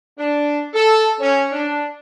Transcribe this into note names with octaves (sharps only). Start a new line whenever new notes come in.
D4
A4
C#4
D4